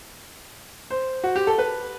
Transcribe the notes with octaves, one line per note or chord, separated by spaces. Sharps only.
C5
F#4
G4
A4
B4